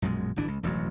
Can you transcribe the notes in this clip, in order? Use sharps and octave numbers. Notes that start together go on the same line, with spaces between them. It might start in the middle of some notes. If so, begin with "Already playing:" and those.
A#1 F#2 B2 G#3
D1 G1 E3 D4
C#2
E1 A1 F2 F#3